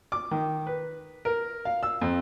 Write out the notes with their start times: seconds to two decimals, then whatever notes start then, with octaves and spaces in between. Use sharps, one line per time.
0.12 D6
0.31 D#3
0.67 B4
1.25 A#4
1.65 F5
1.83 E6
2.01 F2